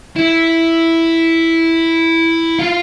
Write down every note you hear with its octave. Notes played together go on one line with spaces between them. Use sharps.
E4
F4